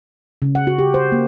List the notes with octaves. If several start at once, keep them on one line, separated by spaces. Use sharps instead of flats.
C#3
F#5
F#4
G4
C5
A#3